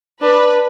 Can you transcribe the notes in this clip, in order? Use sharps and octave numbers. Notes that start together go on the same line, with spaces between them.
D4 B4